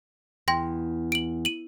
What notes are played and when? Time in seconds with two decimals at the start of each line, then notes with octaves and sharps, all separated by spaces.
0.48 E2 G5 C6 A#6
1.12 D7 F#7
1.45 D#7 F#7